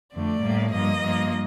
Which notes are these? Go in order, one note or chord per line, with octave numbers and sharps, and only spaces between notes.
F2 D3 A3 D5
A2 G3 A#3
G2 F3 A#3 D#5
G2 F3 A#3